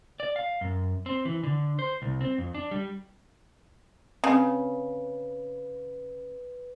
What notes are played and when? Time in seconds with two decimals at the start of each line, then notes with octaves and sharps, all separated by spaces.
0.20 D5
0.36 F5
0.61 F#2
1.06 C4
1.25 E3
1.43 D3
1.79 C5
2.02 C2
2.21 C4
2.38 F2
2.54 D4
2.71 G3
4.24 C#3 C4 B4